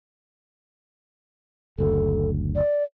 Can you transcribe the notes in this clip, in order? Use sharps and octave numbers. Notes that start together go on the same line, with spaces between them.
F#1 D2 A4
D5